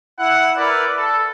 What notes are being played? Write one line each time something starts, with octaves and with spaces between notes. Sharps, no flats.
E4 F#5
E4 A#4 B4 D5
A4